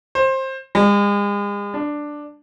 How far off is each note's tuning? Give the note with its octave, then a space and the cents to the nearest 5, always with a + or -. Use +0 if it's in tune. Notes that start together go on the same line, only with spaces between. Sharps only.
C5 +20
G#3 -40
D4 +5